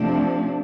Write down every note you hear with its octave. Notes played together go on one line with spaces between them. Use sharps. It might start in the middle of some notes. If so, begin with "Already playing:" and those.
Already playing: C3 F3 A3 D4